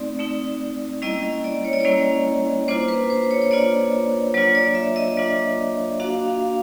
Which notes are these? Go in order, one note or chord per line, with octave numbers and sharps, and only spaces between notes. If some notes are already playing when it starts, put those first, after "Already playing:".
Already playing: A3 C4 D#4 D5
A3 C4 D#4
G3 A#3 C#4 E4 D#5
D#5
D5
C#5
D5
G3 A#3 C#4 E4 C#5
A#3 D4 F4 C5
B4
C5
C#5
C#5
A#3 D4 F4 D5
F#3 A#3 D4 F4 C#5
D5
E5
D#5
F#3 A#3 D4 F4
A#3 D4 F#4 F5
F5